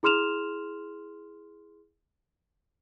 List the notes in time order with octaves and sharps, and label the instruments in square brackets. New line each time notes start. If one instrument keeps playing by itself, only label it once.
[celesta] E4 G#4 C6 F6 E7 F7